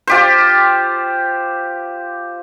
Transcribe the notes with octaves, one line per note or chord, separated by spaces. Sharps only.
F4 G4 C5